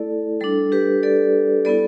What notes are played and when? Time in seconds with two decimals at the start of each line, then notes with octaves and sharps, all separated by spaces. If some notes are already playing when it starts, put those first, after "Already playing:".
Already playing: A3 E4 A4 D5
0.41 G3 D4 A4
0.72 G4 B4
1.03 A4 D5
1.65 G3 B3 E4 A4 D5